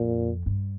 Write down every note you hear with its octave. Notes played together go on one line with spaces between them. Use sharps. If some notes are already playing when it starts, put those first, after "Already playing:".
Already playing: F2 A#2
G2